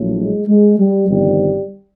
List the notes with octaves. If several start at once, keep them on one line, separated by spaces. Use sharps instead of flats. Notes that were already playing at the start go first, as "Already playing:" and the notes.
Already playing: A#1 A2 F#3
G#3
G#3
G3
G1 F2 C3 D#3 G3